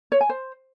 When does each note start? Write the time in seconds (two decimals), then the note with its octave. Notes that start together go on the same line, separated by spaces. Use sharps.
0.12 C#5
0.21 G#5
0.29 C5